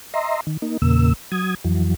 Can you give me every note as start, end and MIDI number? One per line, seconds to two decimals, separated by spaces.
0.14 0.41 75
0.14 0.41 76
0.14 0.41 82
0.14 0.41 84
0.47 0.57 51
0.62 0.78 58
0.62 0.78 63
0.82 1.13 40
0.82 1.13 46
0.82 1.13 49
0.82 1.13 58
0.82 1.13 88
1.32 1.55 54
1.32 1.55 87
1.32 1.55 92
1.65 1.95 41
1.65 1.95 52
1.65 1.95 54